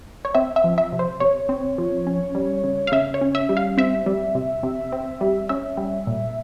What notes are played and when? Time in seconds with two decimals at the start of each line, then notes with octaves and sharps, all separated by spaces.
0.25 C#5
0.34 C4 E5
0.56 E5
0.64 F3
0.78 E5
0.92 C3
0.99 C5
1.20 C3 C#5
1.49 C4
1.78 F3
2.07 C#4
2.35 G3
2.64 C#3
2.87 F5
2.92 C#3 E5
3.14 C#5
3.21 C#4
3.35 E5
3.49 G3
3.57 F5
3.77 C4 E5
4.06 G3
4.35 C3
4.63 C3
4.92 C4
5.21 G3
5.49 C#4 E5
5.77 G3
6.07 A#2